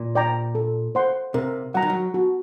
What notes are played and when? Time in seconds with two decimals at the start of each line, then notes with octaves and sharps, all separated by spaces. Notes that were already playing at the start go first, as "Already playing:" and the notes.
Already playing: A#2
0.15 D5 G5 A#5
0.55 A4
0.95 C5 F#5 C6
1.34 C3 A#4
1.74 F#3 F#5 A#5
1.82 D#3
1.90 F#3
2.14 F#4